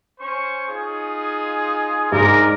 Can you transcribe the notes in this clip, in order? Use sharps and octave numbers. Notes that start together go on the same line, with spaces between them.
C#4 C5 C#6
D#4 F4 G#4
G#2 D4 G#4 A#4 D5